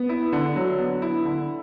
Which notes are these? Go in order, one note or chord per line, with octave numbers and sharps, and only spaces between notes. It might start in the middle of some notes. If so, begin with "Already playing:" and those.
Already playing: B3
E4
D3
F#3
B3
E4
D3